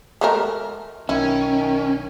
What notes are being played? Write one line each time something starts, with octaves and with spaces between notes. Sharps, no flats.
G#3 A3 A#4
B1 D#3 C#4 E4